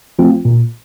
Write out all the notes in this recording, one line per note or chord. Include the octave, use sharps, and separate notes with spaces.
F3 A3 C4 F4
A#2